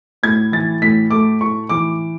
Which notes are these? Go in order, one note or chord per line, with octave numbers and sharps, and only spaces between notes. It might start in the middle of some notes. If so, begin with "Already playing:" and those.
A2 G#6
E3 A6
A2 B6
A3 D6
A2 C#6
E3 D6